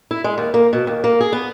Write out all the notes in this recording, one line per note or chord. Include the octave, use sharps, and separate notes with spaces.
E4
G#3
D#2
A#3
B2
D#2
A#3
G#4
B3